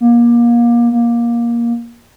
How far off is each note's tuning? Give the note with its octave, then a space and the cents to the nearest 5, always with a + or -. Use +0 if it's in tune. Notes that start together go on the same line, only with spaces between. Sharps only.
A#3 +25
A#3 +15